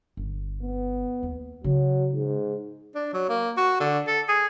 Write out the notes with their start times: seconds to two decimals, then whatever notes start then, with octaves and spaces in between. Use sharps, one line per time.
0.17 G1
0.62 B3
1.23 D#2
1.64 C#3 E3 F#3
2.14 G#2
2.95 D4
3.14 F#3
3.29 A#3
3.57 F#4
3.80 D3
4.07 A4
4.29 G#4